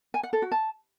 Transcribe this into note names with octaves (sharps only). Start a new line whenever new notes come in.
G#5
F#5
A4
F#4
A5